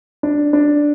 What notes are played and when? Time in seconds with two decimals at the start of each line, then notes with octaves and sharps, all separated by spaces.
0.23 D4
0.53 D4